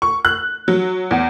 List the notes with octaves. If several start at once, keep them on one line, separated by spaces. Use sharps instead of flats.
C#6
F#6
F#3
E2